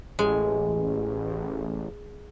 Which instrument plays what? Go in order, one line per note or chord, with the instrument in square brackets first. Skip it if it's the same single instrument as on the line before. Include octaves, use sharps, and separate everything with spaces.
[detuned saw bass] A1 [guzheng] G#3